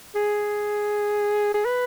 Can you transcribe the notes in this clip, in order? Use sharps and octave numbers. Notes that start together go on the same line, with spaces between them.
G#4
G#4
B4